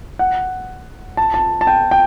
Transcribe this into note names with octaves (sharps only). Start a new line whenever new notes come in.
F#5
A5
A5
A5
G5
G5